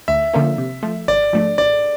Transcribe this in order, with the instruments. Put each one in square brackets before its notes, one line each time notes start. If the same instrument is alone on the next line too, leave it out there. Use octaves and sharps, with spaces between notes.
[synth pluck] D2 [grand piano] E5
[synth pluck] D3 F3 A#3 C#4
C3
F3 A3
[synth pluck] G#1 [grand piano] D5
[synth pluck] G#2 F3 A3 D4
[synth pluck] A1 [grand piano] D5